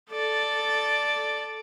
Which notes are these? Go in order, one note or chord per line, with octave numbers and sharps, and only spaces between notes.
A4 D5